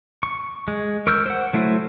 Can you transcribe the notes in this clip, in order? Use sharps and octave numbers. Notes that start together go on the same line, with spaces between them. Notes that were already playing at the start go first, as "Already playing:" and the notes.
C#6
G#3
A#4 C#6 E6 F6 G6
C5 F#5
F#3 A3 E4 C5